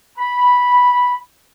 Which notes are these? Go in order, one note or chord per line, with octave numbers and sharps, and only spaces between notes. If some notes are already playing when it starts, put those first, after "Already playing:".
B5